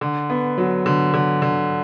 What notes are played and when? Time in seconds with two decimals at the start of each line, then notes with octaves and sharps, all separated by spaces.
0.01 D3
0.30 B3
0.58 F#3
0.86 D3
1.14 D3
1.42 D3